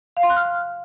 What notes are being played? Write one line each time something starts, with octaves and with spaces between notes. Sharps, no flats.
F5
C6
F#6
F6